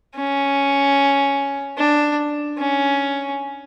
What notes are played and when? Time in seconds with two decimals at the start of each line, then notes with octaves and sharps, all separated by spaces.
0.16 C#4
1.78 D4
2.58 C#4